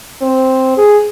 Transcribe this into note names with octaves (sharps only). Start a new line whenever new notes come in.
C4
G#4